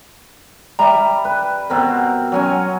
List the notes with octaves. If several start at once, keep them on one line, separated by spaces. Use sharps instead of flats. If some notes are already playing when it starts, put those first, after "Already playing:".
G3 E5 A#5
B4
B2 C4 A#4
F#3 C#4 G#5